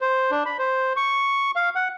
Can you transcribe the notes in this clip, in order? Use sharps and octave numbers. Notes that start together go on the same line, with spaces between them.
C5
D4
B5
C5
C#6
F5
F#5